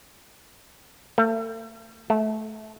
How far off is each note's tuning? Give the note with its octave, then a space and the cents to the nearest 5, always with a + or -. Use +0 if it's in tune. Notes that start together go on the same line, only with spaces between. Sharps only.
A3 +40
A3 -20